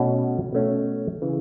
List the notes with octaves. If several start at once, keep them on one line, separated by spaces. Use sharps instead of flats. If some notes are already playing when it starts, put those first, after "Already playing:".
Already playing: B2 A3 C#4
B2 A3 C#4
C#3 E3